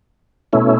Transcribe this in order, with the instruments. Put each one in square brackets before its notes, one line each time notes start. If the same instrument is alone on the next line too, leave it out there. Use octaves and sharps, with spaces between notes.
[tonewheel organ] B2 A3 C#4 E4